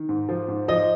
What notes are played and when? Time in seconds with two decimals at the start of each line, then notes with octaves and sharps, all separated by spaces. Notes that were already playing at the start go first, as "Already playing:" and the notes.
Already playing: D#3
0.09 G#2
0.29 F3
0.48 G#2
0.68 F3 D#5